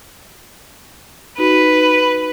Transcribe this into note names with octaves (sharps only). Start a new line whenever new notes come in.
D#4 F#4 B4